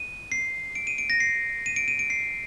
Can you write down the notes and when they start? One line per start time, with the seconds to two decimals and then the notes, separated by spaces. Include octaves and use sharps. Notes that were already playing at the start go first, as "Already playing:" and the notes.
Already playing: D#7
0.32 C7
0.75 D7
0.87 D#7
0.98 D7
1.10 A#6
1.20 C7
1.66 D#7
1.76 D7
1.88 D#7
1.99 D7
2.10 C7